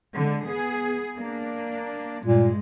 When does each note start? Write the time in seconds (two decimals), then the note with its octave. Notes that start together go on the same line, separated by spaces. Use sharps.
0.15 D3 G#3
0.47 B3 G#4
1.17 A#3 D4
2.25 G2 A#2 G#3